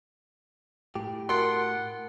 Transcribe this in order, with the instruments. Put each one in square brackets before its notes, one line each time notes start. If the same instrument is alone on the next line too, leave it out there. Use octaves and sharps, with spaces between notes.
[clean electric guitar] A2 G4
[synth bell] F#4 A#4 A5 [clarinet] F#5 [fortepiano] C6